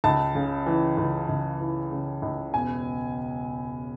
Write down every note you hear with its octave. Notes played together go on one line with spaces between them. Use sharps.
C#2 A5
C#3
E3
C#2
C#2
E3
C#3
C#2
E1 G#5